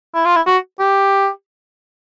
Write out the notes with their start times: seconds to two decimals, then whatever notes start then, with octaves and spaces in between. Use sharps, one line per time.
0.15 E4
0.25 F4
0.36 E4
0.47 F#4
0.79 G4